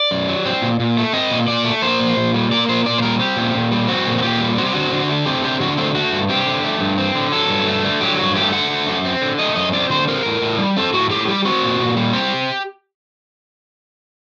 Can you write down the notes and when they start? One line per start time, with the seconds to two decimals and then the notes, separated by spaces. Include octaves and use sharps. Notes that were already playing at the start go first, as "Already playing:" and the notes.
Already playing: D5
0.11 F#2
0.28 F#3
0.46 C4
0.62 A#2
0.80 A#2
0.97 A3
1.13 C4 D#5
1.31 A#2
1.48 A#2 D5
1.65 A3
1.82 A#3 C5
2.00 A#2
2.16 A#2
2.34 G3
2.51 A#3 D5
2.69 A#2 C5
2.86 A#2 D5
2.98 C5
3.02 G3 A#4
3.19 C4 G4
3.37 A#2
3.55 A#2
3.71 G3
3.88 C4 F#4
4.07 A#2
4.18 F#4
4.23 A#2 G4
4.40 G3
4.58 C4 F#4
4.65 G4
4.73 D3 F#4
4.92 D3
5.09 A3
5.26 C4 G4
5.44 D3 G4
5.60 D3 F#4
5.77 A3 C4
5.95 A3 F#4
6.13 G2
6.29 C4 G4
6.46 D3
6.64 A3
6.81 G2
6.98 C4
7.15 D3
7.32 F#3 A4
7.49 G2
7.68 A3
7.85 D3
8.01 F#3 G4
8.19 G2 F#4
8.36 A3 G4
8.53 D3 F#5
8.70 A3
8.87 F#2
9.05 C4
9.21 D3
9.38 A3 D#5
9.56 F#2 D#5
9.73 C4 D5
9.90 D3 C5
10.08 C4 A#4
10.25 A2
10.42 A2
10.59 G3
10.77 C4 A4
10.94 A2 F#4
11.10 A2 G4
11.28 G3 G4
11.45 C4 F#4
11.63 A#2
11.80 A#2
11.97 G3
12.13 C4 G4